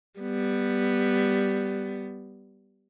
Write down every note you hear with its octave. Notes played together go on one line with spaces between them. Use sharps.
G3 B3